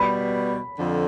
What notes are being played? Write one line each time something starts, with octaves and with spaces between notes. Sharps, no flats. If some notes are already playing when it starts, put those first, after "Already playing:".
Already playing: B2 G3 B3 B5
F2 D3 F3